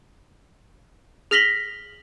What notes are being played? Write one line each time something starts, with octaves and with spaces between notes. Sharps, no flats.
G#4 F6 A#6 B6 F#7 G7